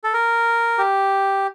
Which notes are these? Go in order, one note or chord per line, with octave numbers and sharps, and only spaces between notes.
A4
A#4
G4